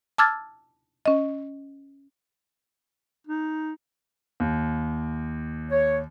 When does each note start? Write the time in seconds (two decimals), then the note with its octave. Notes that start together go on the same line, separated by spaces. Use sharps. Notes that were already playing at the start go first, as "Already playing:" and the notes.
0.18 A5 D6 E6 F6 G#6 A6
1.06 C#4 D#5
3.27 D#4
4.40 D#2
5.71 C#5